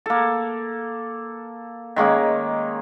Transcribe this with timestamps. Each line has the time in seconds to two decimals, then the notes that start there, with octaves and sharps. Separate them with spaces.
0.06 A#3 A4
1.96 D#3 G#3 A#3 C#4